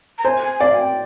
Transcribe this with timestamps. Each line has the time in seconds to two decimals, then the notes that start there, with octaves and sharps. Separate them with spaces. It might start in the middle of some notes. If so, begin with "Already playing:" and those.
0.18 A#5
0.25 C5 G#5
0.43 G#5
0.61 D5 F5
0.74 G#5
0.79 G5